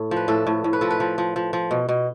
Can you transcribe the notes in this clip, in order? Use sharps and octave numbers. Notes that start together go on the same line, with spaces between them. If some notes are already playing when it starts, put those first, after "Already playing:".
Already playing: A2
F3
B4
A2 A4
A2
A2
B4
F3 A4
B4
F3
F3
F3
F3
B2
B2